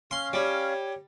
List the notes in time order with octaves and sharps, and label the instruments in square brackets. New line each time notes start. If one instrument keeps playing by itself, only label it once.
[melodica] C#4 F5 [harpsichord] C6
[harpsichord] G3 [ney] C#5